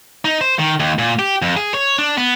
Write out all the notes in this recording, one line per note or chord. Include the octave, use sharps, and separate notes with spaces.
D#4
C5
D#3
D#2
A#2
G4
F2
G#4
C#5
D4
B3